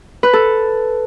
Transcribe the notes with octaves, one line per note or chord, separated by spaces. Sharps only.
B4
A4